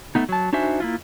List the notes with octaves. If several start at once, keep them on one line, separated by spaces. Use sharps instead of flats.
A3 B3 D#4
F#3 A5
D4 D#4 F#4 C5 E5 G#5
A#3 E4 F4